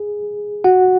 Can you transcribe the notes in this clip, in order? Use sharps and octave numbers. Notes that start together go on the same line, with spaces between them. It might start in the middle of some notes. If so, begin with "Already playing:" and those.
Already playing: G#4
F#4 F#5